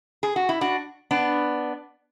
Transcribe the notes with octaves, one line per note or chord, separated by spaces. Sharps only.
G#4
F#4
E4
D4 F#4
B3 D4